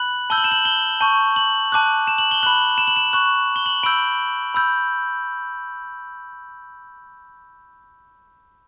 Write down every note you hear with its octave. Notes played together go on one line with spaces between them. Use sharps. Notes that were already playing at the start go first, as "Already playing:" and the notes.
Already playing: B5 F#6 F#7
A5 E6 G6 G7
F#7
E7
F#7
G7
A5 C#6 G6
F#7
A5 D6 F#6
E7
F#7
G7
B5 F#6 F#7
E7
F#7
E7
C#6 F#6
G7
F#7
B5 E6 G6 D7
B5 E6 G6